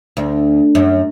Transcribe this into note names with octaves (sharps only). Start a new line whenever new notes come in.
D2
F#2